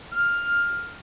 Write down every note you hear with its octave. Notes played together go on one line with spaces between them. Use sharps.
F6